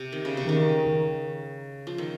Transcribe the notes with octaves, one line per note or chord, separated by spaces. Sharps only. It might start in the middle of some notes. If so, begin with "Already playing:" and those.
Already playing: C3
D#3
C#3
C3
D#3
C#3
F3
D#3